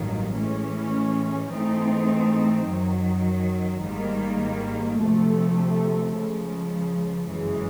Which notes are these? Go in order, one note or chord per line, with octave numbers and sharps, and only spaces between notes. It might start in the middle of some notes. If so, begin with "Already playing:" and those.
Already playing: A1 G2 D#3 F#3 A#3
A2 E3 G#3 C#4
G#2 E3 A3 C4 D#4
F#2 D#3 F#3
G#1 G#2 D#3 G3 A#3
D2 C3 F3 A3
C#2 C#3 F3
G1 F#2 C#3 E3 G#3